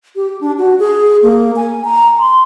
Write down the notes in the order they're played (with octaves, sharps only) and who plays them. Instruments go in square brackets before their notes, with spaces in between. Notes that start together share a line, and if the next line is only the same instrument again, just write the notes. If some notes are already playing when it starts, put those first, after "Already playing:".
[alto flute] G4
D4
F#4
G#4
A#3
G#5
A#5
C6